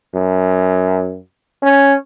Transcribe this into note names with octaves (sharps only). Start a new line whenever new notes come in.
F#2
C#4